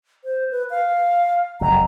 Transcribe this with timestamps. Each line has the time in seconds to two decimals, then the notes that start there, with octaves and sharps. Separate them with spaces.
0.24 C5
0.51 B4
0.70 F5
1.61 F#1 F2 A#5